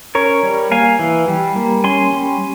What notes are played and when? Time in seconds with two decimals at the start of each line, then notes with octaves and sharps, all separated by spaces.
0.15 C#4 A#4 C#5
0.43 G3
0.71 A#3 F5 G#5
0.99 E3
1.28 G3
1.56 A#3
1.84 C#4 G#5 C6
2.13 G3